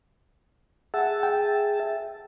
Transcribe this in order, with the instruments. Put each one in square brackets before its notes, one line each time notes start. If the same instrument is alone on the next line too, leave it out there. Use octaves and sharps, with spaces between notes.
[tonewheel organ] G#4 E5 A5 [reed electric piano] F#5
[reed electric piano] G5